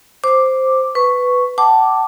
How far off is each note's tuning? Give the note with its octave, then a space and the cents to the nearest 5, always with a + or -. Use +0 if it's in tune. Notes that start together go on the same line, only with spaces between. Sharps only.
C5 +0 D6 +0
B4 +10 C#6 +0
F#5 +40 A5 +0 D6 +0